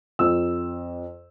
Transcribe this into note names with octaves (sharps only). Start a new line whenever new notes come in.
F2 E6